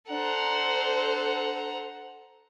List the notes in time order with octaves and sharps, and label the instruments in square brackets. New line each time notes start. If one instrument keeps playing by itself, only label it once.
[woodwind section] D4 [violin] A4 C5 [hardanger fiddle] F#5 A#5